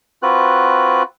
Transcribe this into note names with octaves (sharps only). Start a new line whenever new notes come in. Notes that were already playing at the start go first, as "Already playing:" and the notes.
C4 F4 F#4 B4 F#6